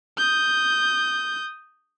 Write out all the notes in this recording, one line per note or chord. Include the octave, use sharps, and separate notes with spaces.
D#6 G6